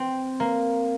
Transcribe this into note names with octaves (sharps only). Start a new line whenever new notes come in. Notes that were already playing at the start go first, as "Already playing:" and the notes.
Already playing: C4
A#3